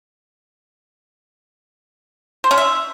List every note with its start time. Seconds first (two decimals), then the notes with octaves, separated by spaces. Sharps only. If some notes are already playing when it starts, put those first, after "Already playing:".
2.44 C5
2.51 C#4
2.58 E5